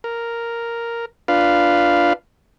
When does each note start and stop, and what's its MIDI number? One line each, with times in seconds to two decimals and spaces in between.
0.04 1.05 70
1.28 2.13 62
1.28 2.13 65
1.28 2.13 71
1.28 2.13 77